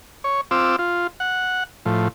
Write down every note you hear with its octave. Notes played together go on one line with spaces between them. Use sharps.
C#5
C4 F4 D6 E6
F4
F#5
A2 F3